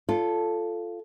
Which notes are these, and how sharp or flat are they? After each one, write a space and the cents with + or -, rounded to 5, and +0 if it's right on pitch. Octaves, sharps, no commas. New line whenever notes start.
F4 -10 A4 +0 C#5 +35